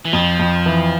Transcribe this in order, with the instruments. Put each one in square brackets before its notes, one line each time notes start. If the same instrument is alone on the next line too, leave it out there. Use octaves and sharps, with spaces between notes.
[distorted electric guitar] E3
[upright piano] F2 [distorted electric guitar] F3
[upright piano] F2
E3